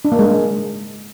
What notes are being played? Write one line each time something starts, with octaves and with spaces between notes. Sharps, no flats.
D4
A#3
G#3